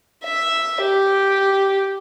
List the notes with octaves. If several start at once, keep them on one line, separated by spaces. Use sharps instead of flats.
E5
G4